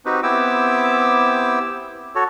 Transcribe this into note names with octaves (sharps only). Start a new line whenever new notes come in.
C4 D#4 F#4 G4 B4
B3 C4 E4 G4 D6 E6
F#4 A4 C#5